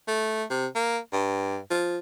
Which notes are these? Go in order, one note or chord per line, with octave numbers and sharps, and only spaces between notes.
A3
C3
A#3
G2
F3